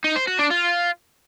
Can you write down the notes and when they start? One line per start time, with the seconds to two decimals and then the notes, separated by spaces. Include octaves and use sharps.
0.04 D#4
0.16 C5
0.27 F#4
0.39 D4
0.50 F4